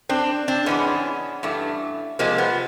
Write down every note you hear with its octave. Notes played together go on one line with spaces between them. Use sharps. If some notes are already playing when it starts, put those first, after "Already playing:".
C4 D4
C4 D4
G#2 E3 G#3 B3 C#4
G2 E3 A3
C3 F3 G#3 A#3 C4
B3